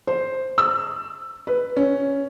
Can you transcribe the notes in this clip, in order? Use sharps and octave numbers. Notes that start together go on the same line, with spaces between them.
C5
E6
B4
C#4